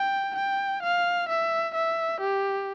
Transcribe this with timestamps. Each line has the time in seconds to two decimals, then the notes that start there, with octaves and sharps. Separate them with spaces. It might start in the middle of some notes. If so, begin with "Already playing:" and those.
Already playing: G5
0.36 G5
0.83 F5
1.29 E5
1.75 E5
2.21 G4